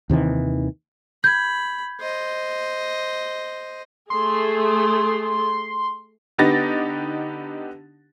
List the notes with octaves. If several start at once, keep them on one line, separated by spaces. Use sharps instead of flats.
D#2 C3 D#3 E3
B5 G6 G#6
C5 D#5
A3 G#4 C6
D3 B3 D#4 G4 A6 A#6